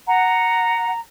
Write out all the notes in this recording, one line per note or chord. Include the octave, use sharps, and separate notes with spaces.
F#5 A#5